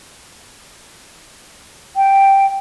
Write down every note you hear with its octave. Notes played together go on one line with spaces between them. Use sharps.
G5